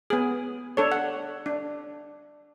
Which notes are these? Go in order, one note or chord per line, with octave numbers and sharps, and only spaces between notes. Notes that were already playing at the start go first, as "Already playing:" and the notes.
B3 G#4
D4 A4 C#5
F#5
D4